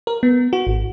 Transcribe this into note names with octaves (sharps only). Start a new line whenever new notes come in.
A#4
B3
F#4
G#1